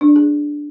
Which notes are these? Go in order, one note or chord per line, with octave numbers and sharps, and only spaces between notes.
D4
D5
G#4